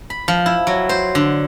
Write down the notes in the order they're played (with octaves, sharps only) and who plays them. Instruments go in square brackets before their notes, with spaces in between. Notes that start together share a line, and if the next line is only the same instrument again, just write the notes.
[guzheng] B5
F3
E4
F#3
C5
D3